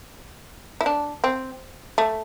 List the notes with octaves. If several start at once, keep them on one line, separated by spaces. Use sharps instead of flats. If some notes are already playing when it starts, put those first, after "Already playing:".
E4
D4
C4
A3